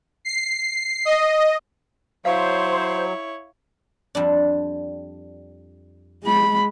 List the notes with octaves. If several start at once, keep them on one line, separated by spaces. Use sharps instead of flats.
C7
D#5
F#3 E4 C5 C#5 F5
F2 G3 D4
G#3 B5